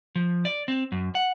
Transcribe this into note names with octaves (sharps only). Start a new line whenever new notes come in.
F3
D5
C4
F#2
F#5